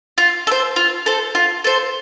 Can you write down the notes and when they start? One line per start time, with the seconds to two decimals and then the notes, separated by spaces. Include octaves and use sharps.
0.18 F4
0.47 A4
0.51 C5
0.76 F4
1.06 A4 C5
1.35 F4
1.64 A4 C5